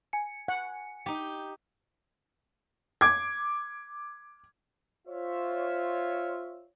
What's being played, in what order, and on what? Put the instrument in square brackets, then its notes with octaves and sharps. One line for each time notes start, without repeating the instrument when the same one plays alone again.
[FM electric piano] G#5 C#7
[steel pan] F#5
[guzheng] D#4 G4
[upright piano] D6 G#6
[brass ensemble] F4 C5 C#5 E5